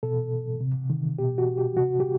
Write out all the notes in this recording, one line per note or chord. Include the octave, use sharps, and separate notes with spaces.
B2 A4
C3
D#3
B2 G4
F#4
G4
C3 F#4
G4